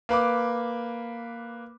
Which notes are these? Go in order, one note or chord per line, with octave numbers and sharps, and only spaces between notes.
A#3 B4 B5 D6